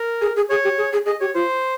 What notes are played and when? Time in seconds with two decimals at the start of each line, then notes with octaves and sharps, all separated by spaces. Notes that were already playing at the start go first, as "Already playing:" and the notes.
Already playing: A#4
0.21 G#4
0.36 G#4
0.50 G#4 C#5
0.64 G4
0.78 G#4
0.93 G#4
1.06 G#4 D#5
1.20 G4 C#5
1.35 F4 C5